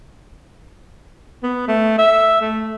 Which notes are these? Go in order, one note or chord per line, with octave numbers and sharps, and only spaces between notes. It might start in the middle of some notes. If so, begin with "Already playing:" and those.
B3
A3
E5
A3